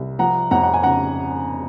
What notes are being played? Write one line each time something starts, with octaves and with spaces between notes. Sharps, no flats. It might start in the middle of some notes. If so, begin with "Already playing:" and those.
Already playing: C2
F3 F#5 A#5
F2 F#5 A#5
F#5
G#5
C#3 F#5 A#5